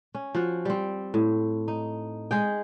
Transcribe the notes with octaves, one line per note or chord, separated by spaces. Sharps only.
C#4
F3 F#4
G3 C4
A2
D#4
G#3 G#4 G5